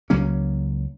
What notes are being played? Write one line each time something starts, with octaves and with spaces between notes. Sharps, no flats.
C#2 F#3 A#3 C#4